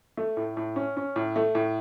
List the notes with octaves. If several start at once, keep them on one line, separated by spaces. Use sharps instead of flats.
A3
A2
A2
C#4
C#4
A2
A3
A2